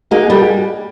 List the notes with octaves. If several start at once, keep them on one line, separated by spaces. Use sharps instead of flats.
A#3 D#4 F#4 G#4
G3 G4 A4
F#4 G#4